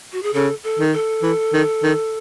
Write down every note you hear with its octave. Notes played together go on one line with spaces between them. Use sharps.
F#4
G#4
C#3 A4
A4
D#3
A4
E3
D#3
D#3